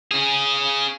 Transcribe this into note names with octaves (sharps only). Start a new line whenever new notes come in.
C#4 G#4